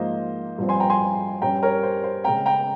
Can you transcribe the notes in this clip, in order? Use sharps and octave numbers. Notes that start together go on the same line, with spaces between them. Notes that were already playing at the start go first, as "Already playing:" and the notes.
Already playing: G#2 F3 A#3 C5 D#5
G2 F3 C4
G#5 C6
G5 A#5
G#5 C6
G2 G3 C#4 G5 A#5
A#4 C#5
C5
C5
C#3 G#3 C4 G5 A#5
G5 A#5